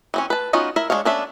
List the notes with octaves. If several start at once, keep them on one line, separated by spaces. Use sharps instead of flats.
E3 C4 C#4
B4 A5
B3 C#4 D#4 F4 F#4
E4 A#4 E5
G#3 C#4 D4 C#5 F5
B3 C#4 D4 A4 E5